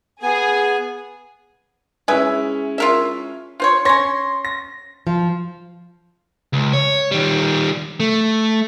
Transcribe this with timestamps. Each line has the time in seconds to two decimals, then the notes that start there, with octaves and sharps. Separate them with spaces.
0.22 B3 G#4 G#5
2.08 G#3 C#4 E4 G#4 B4 E5
2.78 F4 A#4 E5
3.60 F4 C5 C#5
3.85 C#4 C#5 C6 A#6
4.45 A#6
5.07 F3
6.53 C#2
6.73 C#5
7.12 D#3 G3
8.00 A3